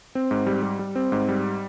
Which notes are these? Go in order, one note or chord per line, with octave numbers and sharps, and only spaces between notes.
C4
G#2
G3
G3
G3
C4
G#2
G3